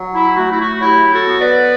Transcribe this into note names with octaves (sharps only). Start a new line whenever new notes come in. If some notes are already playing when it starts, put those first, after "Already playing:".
Already playing: F#3
E4
A3 F#4
E4
F#4
F#3 E4 G4
F#4 A4
B3
B4 D5